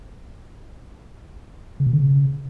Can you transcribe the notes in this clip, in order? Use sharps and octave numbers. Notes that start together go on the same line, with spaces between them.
C#3
B2
D3
C#3